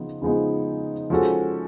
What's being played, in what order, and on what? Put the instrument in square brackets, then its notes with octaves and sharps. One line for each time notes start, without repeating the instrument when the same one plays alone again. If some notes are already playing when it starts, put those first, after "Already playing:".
Already playing: [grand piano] C#3 F3 B3 D#4
C#3 F3 G#3 B3 D#4
F3 G#3 C#4 F#4 A4